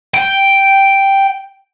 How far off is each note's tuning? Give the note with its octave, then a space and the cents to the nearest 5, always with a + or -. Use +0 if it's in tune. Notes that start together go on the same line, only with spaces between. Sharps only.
G5 +0